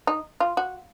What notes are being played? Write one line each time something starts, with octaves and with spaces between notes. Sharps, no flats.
D#4
F4
F#4